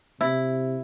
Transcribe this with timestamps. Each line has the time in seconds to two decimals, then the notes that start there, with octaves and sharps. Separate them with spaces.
0.21 C3 E4